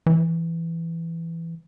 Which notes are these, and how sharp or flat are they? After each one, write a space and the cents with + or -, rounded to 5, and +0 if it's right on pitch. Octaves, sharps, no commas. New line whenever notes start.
E3 +10